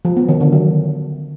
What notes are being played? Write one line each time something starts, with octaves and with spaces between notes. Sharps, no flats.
F3
B3
D#3
D3
F#3